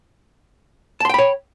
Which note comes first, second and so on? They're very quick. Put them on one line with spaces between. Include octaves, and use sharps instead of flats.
A5 C6 G5 B5 C#5